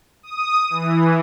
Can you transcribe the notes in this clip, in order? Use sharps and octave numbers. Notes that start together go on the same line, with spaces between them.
D#6
E3